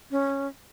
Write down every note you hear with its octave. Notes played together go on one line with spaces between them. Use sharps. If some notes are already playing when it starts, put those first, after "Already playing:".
C#4